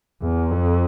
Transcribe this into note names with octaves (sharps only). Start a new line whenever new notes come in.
E2
F2